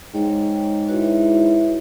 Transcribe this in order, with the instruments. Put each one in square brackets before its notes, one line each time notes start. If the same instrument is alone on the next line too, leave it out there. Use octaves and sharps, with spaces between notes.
[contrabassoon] G#2 [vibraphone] C#5 G5
[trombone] E4 [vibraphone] F#4 B4 C#5